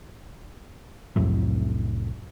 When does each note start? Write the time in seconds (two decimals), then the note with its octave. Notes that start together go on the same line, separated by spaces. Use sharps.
1.16 C2 F2 A2 F#3